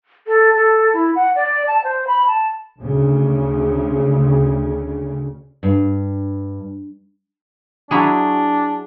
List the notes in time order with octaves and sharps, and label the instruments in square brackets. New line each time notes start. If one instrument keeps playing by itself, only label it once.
[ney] A4
A4
E4
F#5
D5
A5
C5
B5
A5
[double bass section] D2 C#3
[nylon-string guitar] G2
[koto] F#3 E4 G#4 [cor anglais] D4